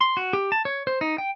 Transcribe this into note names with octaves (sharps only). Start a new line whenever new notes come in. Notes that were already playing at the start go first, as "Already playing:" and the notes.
C6
F#4
G4
A5
C#5
C5
D#4
G5